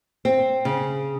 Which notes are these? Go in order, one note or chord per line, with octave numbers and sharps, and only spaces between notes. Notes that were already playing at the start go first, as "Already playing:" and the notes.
C4
C#3